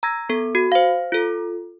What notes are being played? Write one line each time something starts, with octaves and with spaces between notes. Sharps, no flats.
A#5 E6 G#6 A#6
B3 A4
F#4
C5 F5
F4 A4